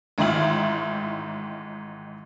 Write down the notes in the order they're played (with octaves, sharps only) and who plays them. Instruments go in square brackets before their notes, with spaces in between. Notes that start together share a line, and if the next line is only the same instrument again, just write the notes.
[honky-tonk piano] A1 G#2 D#3 E4 F4 F#7